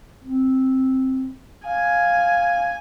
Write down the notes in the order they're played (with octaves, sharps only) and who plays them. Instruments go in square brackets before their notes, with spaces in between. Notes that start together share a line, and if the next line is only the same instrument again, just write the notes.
[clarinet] C4
[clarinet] F5 [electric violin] G#5